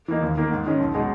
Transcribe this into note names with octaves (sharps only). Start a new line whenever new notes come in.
E3 A#3 D#4
D#2
D#3 A#3
G#2
D#3 G#3 C#4
B1
B2 G#3 D#4 G#4